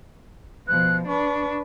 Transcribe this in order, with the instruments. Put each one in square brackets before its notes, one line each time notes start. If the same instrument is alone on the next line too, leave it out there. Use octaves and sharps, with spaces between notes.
[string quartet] B2 F3 [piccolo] F#6
[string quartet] D4 B4 [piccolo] C#6